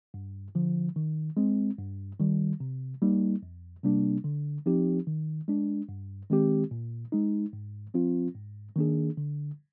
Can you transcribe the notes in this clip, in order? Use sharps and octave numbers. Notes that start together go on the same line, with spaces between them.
G2
D3 F3
D#3
G#3 C4
G2
D#3 G3
C3
G3 A#3 D#4
F2
C3 G3 A#3 D4
D3
F3 C4 D#4 G4
D#3
G#3 D4
G2
D#3 G#3 C4 G4
A#2
G#3 D#4
G#2
F3 C4 F4
G#2
D#3 A#3 D4 G#4
D3